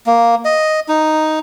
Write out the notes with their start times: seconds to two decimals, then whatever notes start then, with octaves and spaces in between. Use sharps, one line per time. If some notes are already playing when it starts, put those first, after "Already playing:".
0.07 A#3
0.45 D#5
0.89 D#4